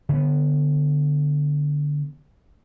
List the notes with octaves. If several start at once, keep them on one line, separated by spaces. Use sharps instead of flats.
D3 B3